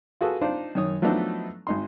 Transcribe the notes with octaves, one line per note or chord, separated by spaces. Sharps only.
F4 F#4 G#4 A4 B4
D4 D#4 F4 C5 D5
F#2 D#3 C#5 D#6
F3 F#3 A3 B3 D4 D#4
G#1 D#4 C6